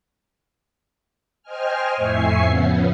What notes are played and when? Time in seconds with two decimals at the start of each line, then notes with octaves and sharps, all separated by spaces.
1.43 C5 D#5 G5 G#5 F6
1.95 F2 A2 E5 G#5 C#6 C7
2.44 C#3 F3 B3 C#4